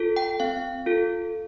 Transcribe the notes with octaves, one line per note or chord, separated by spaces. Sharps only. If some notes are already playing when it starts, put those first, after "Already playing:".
Already playing: F4 A4
G5
C4 F5
F4 A4